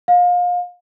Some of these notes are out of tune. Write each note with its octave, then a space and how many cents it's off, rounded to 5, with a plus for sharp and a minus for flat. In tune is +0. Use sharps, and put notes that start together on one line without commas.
F5 +30